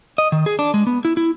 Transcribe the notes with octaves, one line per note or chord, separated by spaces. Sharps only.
D#5
D#3
G#4
D4
G#3
B3
E4
E4